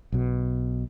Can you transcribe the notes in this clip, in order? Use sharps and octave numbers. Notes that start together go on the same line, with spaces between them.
B1 B2